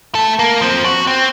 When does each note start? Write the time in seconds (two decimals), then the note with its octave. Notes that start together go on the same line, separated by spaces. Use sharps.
0.15 A3 A4
0.39 A#3
0.62 F3 C4
0.85 F#4
1.07 C4